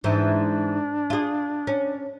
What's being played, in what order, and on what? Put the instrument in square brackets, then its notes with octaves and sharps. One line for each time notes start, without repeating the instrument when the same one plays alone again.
[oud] G#2 E3 [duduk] D4
[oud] F4 G#4
C#4